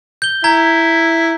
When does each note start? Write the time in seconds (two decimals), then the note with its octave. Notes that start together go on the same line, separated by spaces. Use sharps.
0.22 G6 G7
0.44 E4 A#5 G#6